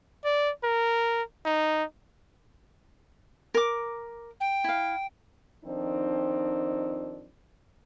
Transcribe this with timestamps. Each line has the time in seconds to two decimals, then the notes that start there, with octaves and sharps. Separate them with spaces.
0.25 D5
0.64 A#4
1.45 D#4
3.54 A#4 D6
4.40 G5
4.64 E4 F5
5.65 F2 D#3 F3 C4 D4 D#4